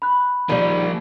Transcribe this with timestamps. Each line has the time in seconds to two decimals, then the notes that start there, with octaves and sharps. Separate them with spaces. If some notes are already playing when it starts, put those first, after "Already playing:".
0.02 B5 F#6
0.49 D#3 F3 G3 A#3